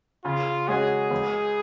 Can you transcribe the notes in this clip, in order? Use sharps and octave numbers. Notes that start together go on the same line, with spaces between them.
C#3 F4
G#3 C#4 F#4 G#4
C#2